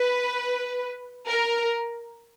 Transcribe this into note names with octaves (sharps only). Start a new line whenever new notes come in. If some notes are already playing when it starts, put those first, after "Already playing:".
Already playing: B4
A#4